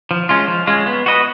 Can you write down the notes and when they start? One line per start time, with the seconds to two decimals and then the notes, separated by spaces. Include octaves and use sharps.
0.11 F3
0.29 G#3 C#4 F4
0.48 F3
0.67 G#3 C#4 F4
0.87 B3
1.06 F#4 B4 D#5